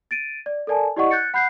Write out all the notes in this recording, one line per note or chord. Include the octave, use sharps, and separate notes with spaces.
A6 D7 D#7
D5
A4 A#4 D5 G#5 A5
E4 G4 D5 D#5 F#5 C#6
F#6 G6 A6 C#7
F#5 B5 F#6 G6 C7